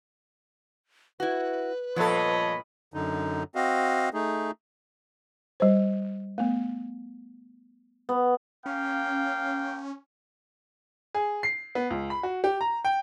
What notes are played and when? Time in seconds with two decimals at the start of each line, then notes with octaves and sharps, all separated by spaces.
1.20 E4 F#4 B4
1.96 G2 A#2 F3 B3 A4 C#5 D#5 B5
2.94 F#2 D3 D#4
3.55 C4 F#4 D#5 F5
4.14 A3 D#4 G#4
5.60 G3 C5
6.38 A3 B3
8.09 B3
8.66 A#3 C#4 F5 G5
11.15 G#4
11.43 C7
11.75 B3
11.90 C#2
12.10 B5
12.23 F#4
12.44 G4
12.61 A#5
12.85 G5